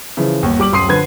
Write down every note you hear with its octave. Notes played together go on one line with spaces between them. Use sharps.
C#3 E3 F3
G1 D#2
G3 D6 F#7
D1 F#2 C6 D#6 C7 D#7
D3 F3 B4 G#6